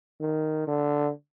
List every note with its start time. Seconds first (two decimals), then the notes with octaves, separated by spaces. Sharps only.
0.21 D#3
0.67 D3